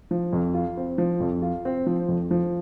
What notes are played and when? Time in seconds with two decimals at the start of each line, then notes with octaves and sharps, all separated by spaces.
0.11 F3
0.33 F2
0.54 F4
0.77 C4
0.98 F3
1.20 F2
1.42 F4
1.65 C4
1.87 F3
2.09 F2
2.31 F3